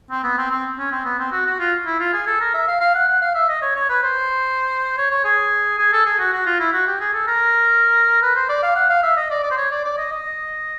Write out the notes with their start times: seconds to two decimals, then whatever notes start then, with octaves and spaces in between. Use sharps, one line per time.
0.11 C4
0.24 B3
0.38 C4
0.51 C4
0.78 C#4
0.92 C4
1.05 B3
1.19 C4
1.32 F#4
1.46 F#4
1.59 F4
1.86 E4
2.00 F4
2.13 G#4
2.27 A4
2.40 A#4
2.54 E5
2.68 F5
2.81 F5
2.95 F#5
3.08 F#5
3.22 F5
3.35 E5
3.49 D#5
3.62 C#5
3.76 C#5
3.89 B4
4.03 C5
4.98 C#5
5.11 C#5
5.24 G#4
5.79 G#4
5.93 A4
6.06 G#4
6.19 F#4
6.33 F#4
6.46 F4
6.60 E4
6.73 F#4
6.87 G4
7.01 G#4
7.13 A4
7.27 A#4
8.22 B4
8.36 C5
8.49 D5
8.63 F5
8.76 F#5
8.90 F5
9.03 E5
9.17 D#5
9.30 D5
9.44 D5
9.51 C5
9.58 C#5
9.71 D5
9.85 D5
9.98 D#5
10.12 D#5